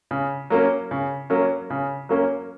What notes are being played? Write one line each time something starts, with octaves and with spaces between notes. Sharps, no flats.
C#3
F#3 A#3 C#4
C#3
F#3 A#3 C#4
C#3
F#3 A#3 C#4